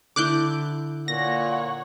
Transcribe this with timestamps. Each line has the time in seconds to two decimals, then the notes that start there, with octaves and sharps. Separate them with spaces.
0.16 D3 E4 D6 F#6 G6
1.08 A#2 C#5 F#5 A#6